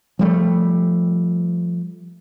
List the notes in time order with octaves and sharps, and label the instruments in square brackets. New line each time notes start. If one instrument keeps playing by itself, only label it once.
[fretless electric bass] F3 G3 A3